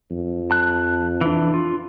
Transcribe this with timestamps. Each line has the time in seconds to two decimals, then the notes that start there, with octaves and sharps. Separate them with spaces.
0.10 F2
0.51 A5 F#6
1.21 E3 D4
1.54 F4